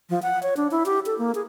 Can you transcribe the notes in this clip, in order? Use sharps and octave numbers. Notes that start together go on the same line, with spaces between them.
F3
F#5
C#5
D4
E4
G4
A4
A#3
G#4